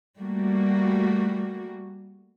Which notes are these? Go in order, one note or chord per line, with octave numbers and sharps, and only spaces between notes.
G3 A3 A#3 F#4